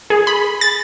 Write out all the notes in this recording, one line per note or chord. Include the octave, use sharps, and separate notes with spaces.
G#4
B5
A6